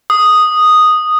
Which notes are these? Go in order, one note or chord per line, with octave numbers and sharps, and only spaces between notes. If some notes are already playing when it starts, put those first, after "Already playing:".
D#6